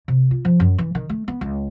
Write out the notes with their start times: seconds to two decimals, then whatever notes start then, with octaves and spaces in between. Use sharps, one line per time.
0.08 C3
0.31 F4
0.45 F3
0.60 F#2
0.78 E3
0.95 D#3
1.09 A3
1.28 B3
1.41 C#2